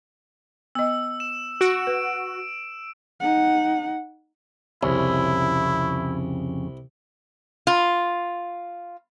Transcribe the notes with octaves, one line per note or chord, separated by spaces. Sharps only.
B3 D#5 E6
E7
F#4 D7
B4
D#4 F#5
C2 F2 C#3 C#4 E4
F4